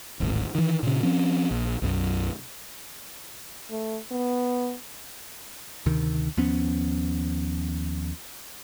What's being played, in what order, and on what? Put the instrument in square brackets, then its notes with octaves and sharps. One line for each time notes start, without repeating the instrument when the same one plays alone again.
[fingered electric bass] D1 G#1
D#3 E3
A#2 C#3
F3 C4 C#4
A#1
B1 F#2
[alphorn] A3
B3
[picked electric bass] D2 C3 D#3
D#2 F3 B3 C#4